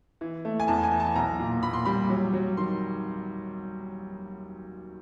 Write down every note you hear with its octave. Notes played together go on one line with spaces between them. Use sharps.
E3
A3
G#5
E2 A5
G#5
E3
A5
B1 A#5
A#2
A#2 B5
C6
G3 B5
F#3
F#3
D#3 C6